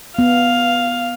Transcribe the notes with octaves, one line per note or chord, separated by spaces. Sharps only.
B3 F5